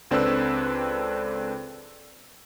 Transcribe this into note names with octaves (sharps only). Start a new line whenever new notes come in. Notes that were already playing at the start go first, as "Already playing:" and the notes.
C#2 C4 D4 A4 B4 E6